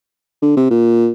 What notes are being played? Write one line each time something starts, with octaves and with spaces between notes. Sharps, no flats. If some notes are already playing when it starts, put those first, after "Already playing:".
D3
C3
A#2